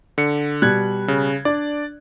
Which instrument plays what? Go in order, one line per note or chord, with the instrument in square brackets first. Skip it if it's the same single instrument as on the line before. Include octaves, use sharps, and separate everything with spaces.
[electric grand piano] D3 C#7
[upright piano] B2 G3 [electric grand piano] F#6 G#6
[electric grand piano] C#3
[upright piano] D4 [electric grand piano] D5